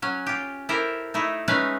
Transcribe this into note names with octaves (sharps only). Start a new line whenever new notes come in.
F#3 C#4
F4 G4
E4 G4 A4 A#4 C5
A3 D#4 E4
G#3 A3 C#4 D#4 B4 F5